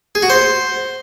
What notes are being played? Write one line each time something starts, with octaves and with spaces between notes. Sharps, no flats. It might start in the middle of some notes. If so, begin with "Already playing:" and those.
G#4
F#4
C5